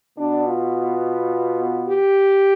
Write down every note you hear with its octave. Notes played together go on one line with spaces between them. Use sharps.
B2 B3 D4
F4
G4